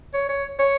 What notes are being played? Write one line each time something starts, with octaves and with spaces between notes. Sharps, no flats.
C#5
C#5
C#5